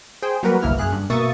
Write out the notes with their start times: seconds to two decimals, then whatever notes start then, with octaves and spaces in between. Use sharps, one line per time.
0.22 G#4 C5 G5
0.43 F#3 G3 A#3 F#4 A#4 B4
0.62 G1 C2 A#3 E4 F6
0.78 F#2 G#4 F#6
0.92 G2
1.10 B2 A#3 E5 C#6 D#6 A6